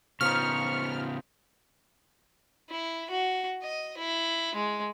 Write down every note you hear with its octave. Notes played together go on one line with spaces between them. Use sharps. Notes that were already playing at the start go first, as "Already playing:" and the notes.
C#3 F3 B3 D#4 C#6 F6
E4
F#4
D#5
E4
G#3